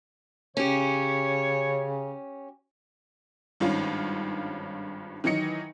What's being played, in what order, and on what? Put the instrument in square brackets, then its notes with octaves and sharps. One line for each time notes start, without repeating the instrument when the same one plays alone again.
[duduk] C#3 [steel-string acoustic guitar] C#4 G4 [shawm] C#5
[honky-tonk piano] G#1 G2 D#3 C#4 F4
D#3 E3 F#3 D#5 C#7